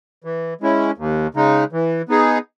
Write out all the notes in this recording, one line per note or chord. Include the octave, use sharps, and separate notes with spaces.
E3
G#3 C#4 E4
D#2
C#3 G#3 D#4
E3
B3 D#4 G#4